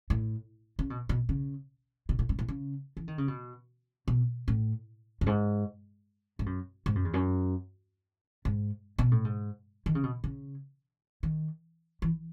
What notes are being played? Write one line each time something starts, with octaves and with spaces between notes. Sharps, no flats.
A2
C#3
B2
B2
C#3
B2
A2
G#2
A2
C#3
E3
D#3
C#3
B2
B2
A2
F#2
G#2
G#2
F#2
G#2
F#2
E2
F#2
G#2
B2
A2
G#2
D#3
C#3
B2
C#3
D#3
E3